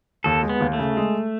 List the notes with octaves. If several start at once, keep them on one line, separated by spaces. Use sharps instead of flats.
D#2 A4
G#3
B3
D#2
A3
C#3
G#3